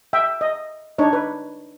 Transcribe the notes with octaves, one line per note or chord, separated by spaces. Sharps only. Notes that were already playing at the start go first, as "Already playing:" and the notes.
E5 G5
D#5
D4 D#4 C#5
B4